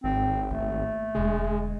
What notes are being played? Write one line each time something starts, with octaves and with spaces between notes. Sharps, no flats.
G#1 C4
A3 A#3
E1 D3 G#3